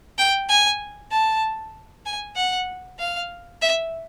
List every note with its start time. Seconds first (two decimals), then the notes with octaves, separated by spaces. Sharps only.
0.18 G5
0.49 G#5
1.11 A5
2.05 G#5
2.36 F#5
2.99 F5
3.62 E5